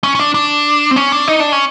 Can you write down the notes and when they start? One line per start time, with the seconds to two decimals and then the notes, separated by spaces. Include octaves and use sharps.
0.04 C#4
0.15 C#4
0.19 D4
0.34 D4
0.91 C4
0.96 C#4
1.12 D4
1.28 D#4
1.40 D4
1.52 C#4